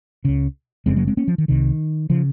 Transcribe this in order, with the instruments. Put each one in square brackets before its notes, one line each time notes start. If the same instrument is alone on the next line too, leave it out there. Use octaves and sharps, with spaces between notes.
[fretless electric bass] C#2 C#3
F#1 F2 C#3 G#3 C4
F#3 A#3
G#3 C4
A#3 C#4
F3
D#3
C2 C3 D#3
C#3 F3